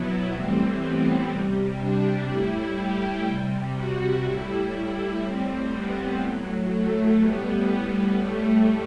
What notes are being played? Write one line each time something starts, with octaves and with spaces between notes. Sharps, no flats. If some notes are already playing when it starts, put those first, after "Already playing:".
Already playing: B2 F#3 B3 E4
A2 E3 G3 C4
B3
C3 G3
D4
A2 G3 E4
G4
C3 G3
F#4
A2 G3 E4
E4
A2 G3 C4
B3
A2 F#3
A3
A2 G3 B3
A2 G3 A3